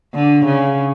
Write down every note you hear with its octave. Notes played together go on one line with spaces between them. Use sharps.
D3
C#3